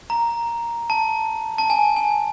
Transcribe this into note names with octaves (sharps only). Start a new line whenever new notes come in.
A#5
A5
A5
G#5
G#5